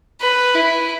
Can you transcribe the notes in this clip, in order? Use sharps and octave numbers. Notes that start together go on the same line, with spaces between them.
B4
E4